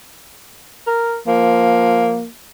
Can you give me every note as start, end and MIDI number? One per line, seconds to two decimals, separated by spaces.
0.87 1.16 70
1.27 2.25 53
1.27 2.27 58